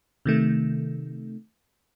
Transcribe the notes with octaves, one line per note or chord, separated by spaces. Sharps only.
C3 D#3 A3